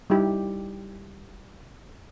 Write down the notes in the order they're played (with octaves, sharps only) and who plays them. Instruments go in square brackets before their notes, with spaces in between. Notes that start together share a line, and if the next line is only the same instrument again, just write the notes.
[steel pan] G3 D#4 E4 G4